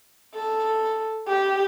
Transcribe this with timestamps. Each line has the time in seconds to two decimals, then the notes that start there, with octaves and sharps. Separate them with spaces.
0.34 A4
1.28 G4